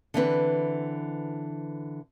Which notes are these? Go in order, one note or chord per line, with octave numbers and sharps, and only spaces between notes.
D3 E3 C4 B4